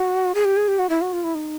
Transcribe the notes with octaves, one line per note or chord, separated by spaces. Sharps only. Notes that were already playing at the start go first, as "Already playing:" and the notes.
Already playing: F#4
G#4
G4
G#4
G4
F#4
E4
F#4
F4
E4
D#4